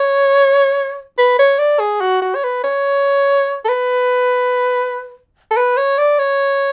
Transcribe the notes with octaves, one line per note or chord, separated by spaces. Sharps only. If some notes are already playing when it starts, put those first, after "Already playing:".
Already playing: C#5
B4
C#5
D5
G#4
F#4
F#4
C#5
B4
C#5
A4
B4
A4
B4
C#5
D5
C#5